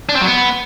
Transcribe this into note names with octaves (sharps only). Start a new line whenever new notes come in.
D4
C4
F#3
B3